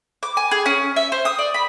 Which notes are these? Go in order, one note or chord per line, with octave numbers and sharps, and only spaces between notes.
D6
G#5
G#4
C#4
E5
C5
D#6
D5
B5